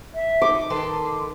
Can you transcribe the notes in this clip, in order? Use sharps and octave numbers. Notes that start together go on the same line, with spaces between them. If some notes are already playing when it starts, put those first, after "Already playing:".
E5
D#4 D6
D#3 A4 B4 C6